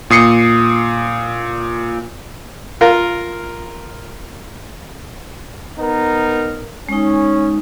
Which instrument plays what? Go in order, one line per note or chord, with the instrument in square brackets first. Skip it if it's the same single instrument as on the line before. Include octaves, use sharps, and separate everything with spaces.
[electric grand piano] A#2 D#6 C7 C#7
[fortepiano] F4 A#4
[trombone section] B3 D#4 A#4
[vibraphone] G#3 D#4 [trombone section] C#4